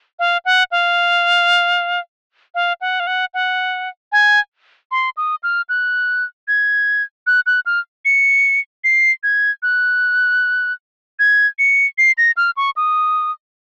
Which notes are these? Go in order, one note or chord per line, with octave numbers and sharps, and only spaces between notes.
F5
F#5
F5
F5
F#5
F5
F#5
F#5
G#5
C6
D#6
F6
F#6
G#6
F#6
F#6
F6
C#7
C7
G#6
F#6
G#6
C#7
C7
A#6
F6
C#6
D#6